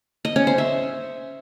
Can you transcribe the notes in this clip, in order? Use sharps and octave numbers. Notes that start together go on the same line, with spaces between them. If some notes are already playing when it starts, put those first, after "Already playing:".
D#5
C#4
C5
E5